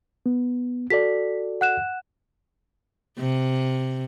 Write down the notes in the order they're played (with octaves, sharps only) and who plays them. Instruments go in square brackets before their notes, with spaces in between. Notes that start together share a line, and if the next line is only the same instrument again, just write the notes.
[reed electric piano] B3
[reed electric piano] F#4 A4 D5 [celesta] B6
[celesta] F#5 F#6 E7
[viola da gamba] C3